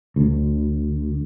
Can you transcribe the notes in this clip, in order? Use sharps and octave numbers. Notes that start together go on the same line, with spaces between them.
D2